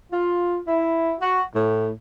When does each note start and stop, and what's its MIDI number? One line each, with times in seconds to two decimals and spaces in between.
0.11 0.59 65
0.67 1.13 64
1.20 1.42 66
1.55 1.89 45